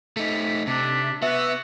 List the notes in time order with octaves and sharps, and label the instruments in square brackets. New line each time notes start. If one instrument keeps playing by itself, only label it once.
[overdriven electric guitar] A3 D#4 [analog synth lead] B6
[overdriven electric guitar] C3 [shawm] D4
[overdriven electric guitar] B3 [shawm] F#4 [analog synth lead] E5